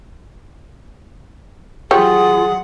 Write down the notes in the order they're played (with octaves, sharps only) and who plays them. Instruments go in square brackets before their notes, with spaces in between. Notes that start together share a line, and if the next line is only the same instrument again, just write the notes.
[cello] F#3 F#5 [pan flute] F4 [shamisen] G4 C#5 [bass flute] G#4